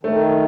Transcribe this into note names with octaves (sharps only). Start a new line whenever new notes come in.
D#3 A3